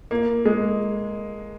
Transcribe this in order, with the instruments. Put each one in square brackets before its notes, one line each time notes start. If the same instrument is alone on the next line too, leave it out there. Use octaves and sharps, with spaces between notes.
[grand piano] A#3
G#3